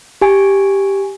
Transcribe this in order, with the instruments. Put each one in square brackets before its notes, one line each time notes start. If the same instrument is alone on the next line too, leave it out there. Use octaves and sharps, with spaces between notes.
[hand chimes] G4 G#5